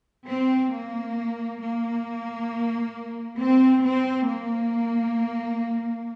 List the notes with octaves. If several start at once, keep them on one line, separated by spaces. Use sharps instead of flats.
C4
A#3
A#3
C4
C4
A#3